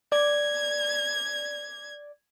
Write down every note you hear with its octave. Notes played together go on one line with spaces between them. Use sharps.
D5 G#6